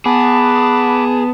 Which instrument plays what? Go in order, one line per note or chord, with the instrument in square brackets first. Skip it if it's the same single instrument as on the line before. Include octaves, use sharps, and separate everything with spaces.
[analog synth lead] B3 [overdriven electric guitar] G#4 [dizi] A5 [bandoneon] B5 D6